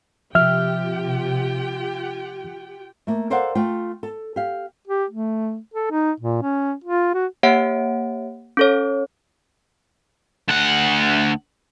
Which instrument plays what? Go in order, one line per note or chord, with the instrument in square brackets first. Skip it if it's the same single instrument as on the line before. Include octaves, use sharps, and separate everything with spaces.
[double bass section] C3 [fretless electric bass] F3 [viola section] F4 G4 G5 [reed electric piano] E5 F6
[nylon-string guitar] A3 A#3
A4 A#4 C5 D5 F5 F#5
A3 F4 G5
A4
G4 F5
[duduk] G4
A3
A4
D#4
A#2
C#4
F4
F#4
[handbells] A#3 G4 C#5 E5 F#5 D7
C#4 A4 C#5
[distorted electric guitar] D2 F#5